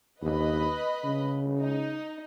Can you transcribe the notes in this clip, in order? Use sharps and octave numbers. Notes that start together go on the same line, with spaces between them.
D#2 B4 D#5 B5
C#3
D#4